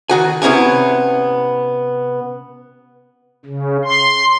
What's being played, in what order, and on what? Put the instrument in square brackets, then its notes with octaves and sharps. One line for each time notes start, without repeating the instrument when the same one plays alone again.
[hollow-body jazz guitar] D#3 F#4 G#5
C3 B3 C#4 E4 G#5
[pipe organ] C#3
C6